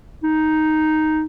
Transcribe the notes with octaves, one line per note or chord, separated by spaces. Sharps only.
D#4